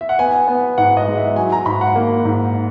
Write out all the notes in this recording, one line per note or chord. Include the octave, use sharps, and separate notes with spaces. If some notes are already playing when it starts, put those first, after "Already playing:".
E5
F#5
B3 G#5
B3
G#2 F#5
D#5
G#3
E5
F#3 G#5
A#5
G#2 B5
F#5
A#3
G#2